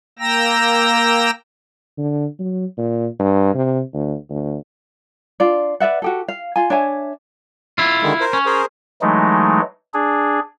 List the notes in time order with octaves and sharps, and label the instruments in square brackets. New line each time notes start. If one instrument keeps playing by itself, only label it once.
[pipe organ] A#3 G5 A#5 E6 A#6
[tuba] D3
F#3
A#2
G2
C3
D2
D2
[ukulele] D4 F4 D5
B4 D5 E5 F#5
F#4 G4 A4
F5
F4 G#5
D4 C#5 E5 G#5
[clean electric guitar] E4 F4
[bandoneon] D3 D#3 G#3
A#4 C5
[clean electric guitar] C#4
[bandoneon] G#4 A#4 C5
[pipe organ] E3 F#3 G#3 A3 D#4
D4 G#4